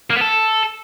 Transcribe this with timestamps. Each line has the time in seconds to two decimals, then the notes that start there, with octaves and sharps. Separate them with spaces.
0.10 A#3
0.16 B3
0.21 A4